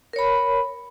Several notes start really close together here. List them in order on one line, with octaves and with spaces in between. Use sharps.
A#4 C#5 B5